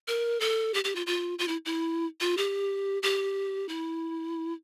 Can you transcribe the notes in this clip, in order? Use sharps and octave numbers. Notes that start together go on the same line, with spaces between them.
A#4
A4
G4
G4
F4
F4
F4
E4
E4
F4
G4
G4
E4